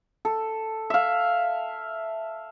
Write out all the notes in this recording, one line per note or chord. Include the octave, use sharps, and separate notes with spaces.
A4
E5 F5